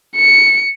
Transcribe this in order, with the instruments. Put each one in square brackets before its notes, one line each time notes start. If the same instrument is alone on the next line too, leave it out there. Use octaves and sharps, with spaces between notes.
[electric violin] C#7